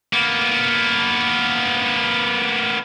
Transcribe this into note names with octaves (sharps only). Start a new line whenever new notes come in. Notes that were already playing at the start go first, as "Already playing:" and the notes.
A#3 B3